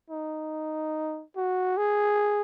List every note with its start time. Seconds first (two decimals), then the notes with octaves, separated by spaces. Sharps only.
0.10 D#4
1.36 F#4
1.77 G#4